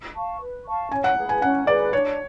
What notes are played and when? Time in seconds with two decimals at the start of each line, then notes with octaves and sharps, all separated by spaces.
0.15 F5 A5 C#6
0.41 B4
0.66 F5 A5 C#6
0.91 C#4 G#5
1.04 F#5
1.17 G#4 B4
1.29 G#5
1.42 C#4 F#5
1.67 G#4 B4 D5
1.93 D4 C#5